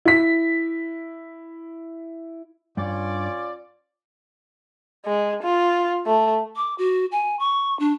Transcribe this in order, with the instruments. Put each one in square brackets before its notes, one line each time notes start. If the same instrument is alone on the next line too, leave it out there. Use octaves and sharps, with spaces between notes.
[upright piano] E4 B6
[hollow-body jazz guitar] G2 [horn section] C#4 F4 D5
[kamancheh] G#3
F4
A3
[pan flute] D6
F#4
G#5
C#6
D4